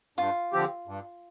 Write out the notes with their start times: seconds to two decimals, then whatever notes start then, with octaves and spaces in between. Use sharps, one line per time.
0.18 G2 F4
0.53 D3 F3 C4 G4
0.87 G2